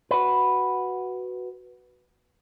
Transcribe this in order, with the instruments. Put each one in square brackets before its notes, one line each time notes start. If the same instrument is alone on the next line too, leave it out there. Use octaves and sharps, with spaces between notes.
[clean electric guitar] F#4 B4